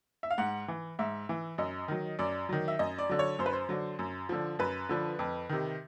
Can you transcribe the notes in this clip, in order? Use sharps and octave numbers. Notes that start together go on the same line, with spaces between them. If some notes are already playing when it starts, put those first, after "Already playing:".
E5
F5
G#2 F#5
E3
G#2 E5
E3
F#2 D#5
D#3 F#3
F#2 D5
D#3 F#3
E5
F#2 D#5
D5
D3 F#3
C#5
F#2 C5
B4
C5
D3 F#3
F#2
D3 F3
F#2 B4
D3 F3
F2
C3 D#3